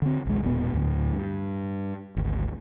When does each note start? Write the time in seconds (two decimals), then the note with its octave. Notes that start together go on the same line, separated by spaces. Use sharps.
0.02 D3 C4
0.25 A#1 D#2 G#3
0.43 E1 A#2 A#3 B3
0.74 D2 A2 D3
1.13 G2
2.17 G#1 D2